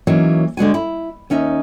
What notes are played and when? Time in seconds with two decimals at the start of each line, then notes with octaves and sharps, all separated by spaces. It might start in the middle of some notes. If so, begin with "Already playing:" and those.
0.07 E3 F#3 A#3 C#4 D#4
0.57 D3 G#3 F#4 G#5
0.74 E4
1.30 D#2 C#4 D#4 E5